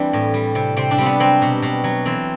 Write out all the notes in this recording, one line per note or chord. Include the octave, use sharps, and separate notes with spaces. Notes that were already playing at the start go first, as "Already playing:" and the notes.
Already playing: E3 G3 C4 D4
A2
G3
C3
C3 C4
D4
G3 C4
B3
F#3 C4
B2
B2
F#3
E3 C4